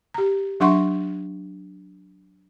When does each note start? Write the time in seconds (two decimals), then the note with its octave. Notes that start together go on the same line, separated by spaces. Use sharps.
0.14 G4 A#5
0.60 F#3 D4 E5 F#5 C6 C#6